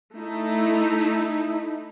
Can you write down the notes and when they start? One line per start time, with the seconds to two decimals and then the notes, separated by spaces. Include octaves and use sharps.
0.14 A3 D#4 E4